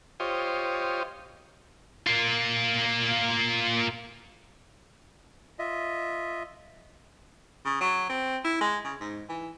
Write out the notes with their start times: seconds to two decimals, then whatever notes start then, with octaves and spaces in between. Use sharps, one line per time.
0.20 F4 G4 C5 C#5 D#5
2.07 A#3 F4
5.59 F4 D#5 E5
7.65 C#3
7.81 F#3
8.09 C4
8.44 E4
8.61 G#3
8.85 C#3
9.01 G#2
9.29 E3